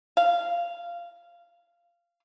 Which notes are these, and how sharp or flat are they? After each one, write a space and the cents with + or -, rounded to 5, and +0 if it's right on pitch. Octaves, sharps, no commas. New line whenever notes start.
F5 -15